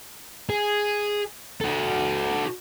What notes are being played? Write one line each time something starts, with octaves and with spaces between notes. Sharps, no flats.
G#4
F#4 A4